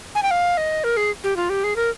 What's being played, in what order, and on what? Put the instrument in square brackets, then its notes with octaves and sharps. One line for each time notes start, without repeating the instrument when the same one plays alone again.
[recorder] G#5
G5
F5
D#5
A#4
G#4
G4
F4
G4
G#4
A#4